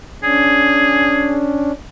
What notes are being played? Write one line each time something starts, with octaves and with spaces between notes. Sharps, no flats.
C#4 D4 G#4